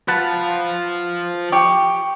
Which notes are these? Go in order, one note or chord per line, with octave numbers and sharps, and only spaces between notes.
F3 F4 B4 F#5 A5
G4 C#6